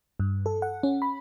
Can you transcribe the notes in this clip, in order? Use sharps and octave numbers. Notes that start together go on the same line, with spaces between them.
G2
A4
F#5
C#4
B5